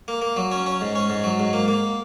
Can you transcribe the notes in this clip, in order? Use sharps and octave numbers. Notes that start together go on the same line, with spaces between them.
A#3
A#3
F#3
C#4
C#4
G#2
C#4
G#2
F#3
G#2
A#3
A#3